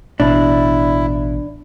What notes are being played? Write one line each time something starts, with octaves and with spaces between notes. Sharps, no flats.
A1 B2 D4 E4